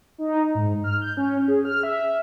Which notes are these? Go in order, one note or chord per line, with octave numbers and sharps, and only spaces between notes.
D#4
G#2
F6
G6
C#4
G#4
F6
E5